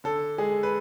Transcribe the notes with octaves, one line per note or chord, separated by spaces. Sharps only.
D3 A4
G#3 G#4
B4